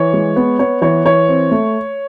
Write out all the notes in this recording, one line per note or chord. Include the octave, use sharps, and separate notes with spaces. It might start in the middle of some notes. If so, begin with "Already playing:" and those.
Already playing: E3 C#5
G#3
B3
B3 C#5
E3 C#5
E3 C#5
C4
A3